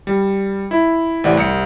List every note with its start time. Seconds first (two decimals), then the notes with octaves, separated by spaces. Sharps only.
0.07 G3
0.71 E4
1.24 A1 C3 E3 A3 D5 F#5
1.37 C2 C#7